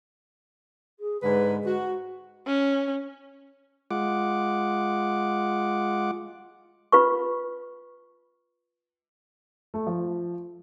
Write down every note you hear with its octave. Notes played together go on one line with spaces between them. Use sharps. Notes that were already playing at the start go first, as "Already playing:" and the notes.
G#4
G#2 D3 G#3 B4
F#4
C#4
G#3 F4 F#5 D6
F4 B4 C#6
A3
F3